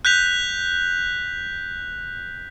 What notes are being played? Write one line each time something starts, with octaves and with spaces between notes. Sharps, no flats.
F#6 G6 B6 F7